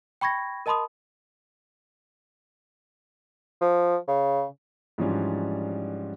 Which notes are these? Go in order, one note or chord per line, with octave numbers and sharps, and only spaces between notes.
G5 B5 C#6 G#6 A#6
A#4 D#5 A5 B5 C6 D#6
F3
C#3
G#2 E3 F3 G3 C#4 D4